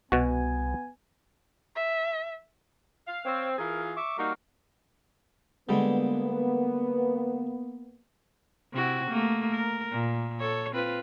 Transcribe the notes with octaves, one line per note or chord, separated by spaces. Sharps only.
C2 B2 B3 F#4 G#5
E5
F5
C4 C#5 F5
E3 F4 G#4 A#4
E5 C#6 D6
G3 A#3 D#4 F#4 A#4
D3 G3 G#3 A#3 B3
C3 E4 F#4
A3 A#3
A#4
A#2
A4 C#5
C4 F4 B4